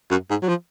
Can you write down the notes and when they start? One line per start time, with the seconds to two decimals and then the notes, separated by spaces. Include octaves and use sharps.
0.11 F#2
0.30 G#2
0.42 F#3
0.48 F3